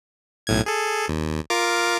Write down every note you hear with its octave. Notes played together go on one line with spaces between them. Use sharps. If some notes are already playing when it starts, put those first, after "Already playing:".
B1 A2 G#6
G#4 A4
D#2
F4 A#4 D6